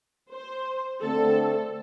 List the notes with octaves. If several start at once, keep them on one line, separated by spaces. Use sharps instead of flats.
C5
D3 A3 C4 A4